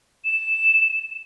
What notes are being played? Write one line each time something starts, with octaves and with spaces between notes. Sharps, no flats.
E7